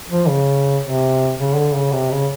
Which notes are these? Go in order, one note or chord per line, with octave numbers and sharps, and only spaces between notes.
F3
C#3
C3
C#3
D3
C#3
C3
C#3